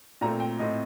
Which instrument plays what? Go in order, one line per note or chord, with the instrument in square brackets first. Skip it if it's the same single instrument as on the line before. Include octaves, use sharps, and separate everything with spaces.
[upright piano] A#2 A3 C4 A#5
G5
A2 A3 C4 D#5